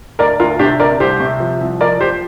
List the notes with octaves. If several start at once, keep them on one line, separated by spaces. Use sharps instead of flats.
D2 A#4 D5
D2 F4 A#4
C3 D4 G4
D2 A#4 D5
C2 G4 C5
C3
F3
C2
F3 A#4 D5
F3 G4 C5